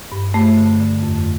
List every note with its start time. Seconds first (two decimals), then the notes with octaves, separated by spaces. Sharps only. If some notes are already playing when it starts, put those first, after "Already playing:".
0.12 G2
0.34 G2 A3
0.57 D3
0.80 D3
1.03 F2